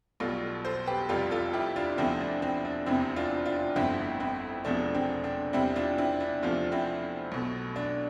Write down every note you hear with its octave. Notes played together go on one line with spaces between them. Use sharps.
B1 B2 G3 F4 A4
A4 C5
G4 B4
F1 F2 C3 G3 F4 A4
F4 A4
E4 G4
D4 F4
E2 D3 F3 A3 C4 E4
D4
C4
D4
F1 E2 C3 C4 E4
D4 F4
D4 F4
G1 F2 D3 A3 C4 E4
C4 E4
E1 E2 C3 F3 A3 D4
C4
D4
E2 C3 G3 C4 E4
D4 F4
C4 E4
D4
E2 C3 F3 A3 D4 F4
C4 E4
B1 B2 A3
D4